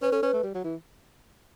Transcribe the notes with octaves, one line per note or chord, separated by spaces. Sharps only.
C#4 B4
C#4 A4
C#4 B4
A3
G3
F#3
E3